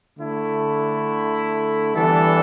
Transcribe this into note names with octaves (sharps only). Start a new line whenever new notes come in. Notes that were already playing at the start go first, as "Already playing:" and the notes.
D3 A3 E4
E3 G3 B3 D4 A4